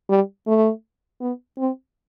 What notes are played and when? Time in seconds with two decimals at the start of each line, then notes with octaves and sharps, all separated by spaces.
0.09 G3
0.47 A3
1.20 B3
1.58 C4